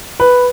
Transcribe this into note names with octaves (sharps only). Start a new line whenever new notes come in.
B4